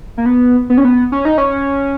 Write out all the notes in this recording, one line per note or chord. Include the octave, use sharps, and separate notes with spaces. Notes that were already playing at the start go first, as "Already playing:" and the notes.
A#3
B3
B3
C#4
B3
C#4
D#4
C#4